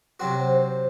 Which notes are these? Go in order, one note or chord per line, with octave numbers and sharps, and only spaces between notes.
C3 F#3 C4 F#4
C5
C5